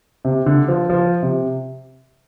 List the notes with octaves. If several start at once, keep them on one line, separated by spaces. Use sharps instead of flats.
C3
D3
F3
F3
C3